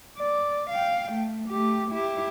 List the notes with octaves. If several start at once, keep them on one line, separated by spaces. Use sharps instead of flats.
D5
F5 G5
A3
A3 G4
E4 G4